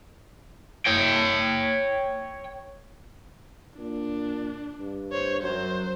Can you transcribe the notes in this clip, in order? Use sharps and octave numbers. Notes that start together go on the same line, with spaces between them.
C#5 G5
A#2 D4
G2
C5 C#5
F#2 F#3 C5